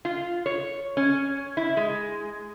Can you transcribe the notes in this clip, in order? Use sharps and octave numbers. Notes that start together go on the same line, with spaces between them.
F4
C#5
C#4
E4
G#3